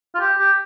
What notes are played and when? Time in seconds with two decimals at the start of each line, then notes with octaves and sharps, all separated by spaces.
0.15 F4
0.20 G4
0.38 G4